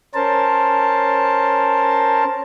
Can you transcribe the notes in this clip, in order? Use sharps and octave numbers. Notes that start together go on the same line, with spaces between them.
C#4 A#4 C5 A5